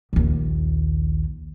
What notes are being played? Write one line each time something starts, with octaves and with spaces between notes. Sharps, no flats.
A#1 D#2